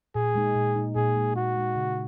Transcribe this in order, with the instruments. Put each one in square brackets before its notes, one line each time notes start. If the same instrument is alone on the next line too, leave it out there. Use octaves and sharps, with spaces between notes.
[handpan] A#2 [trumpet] G#4
[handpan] G#3 D#4
A#2
G#3 D#4
[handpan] A#2 [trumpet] G#4
[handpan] G#3 D#4
[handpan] A#2 [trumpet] F#4
[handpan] G#3 D#4
C#3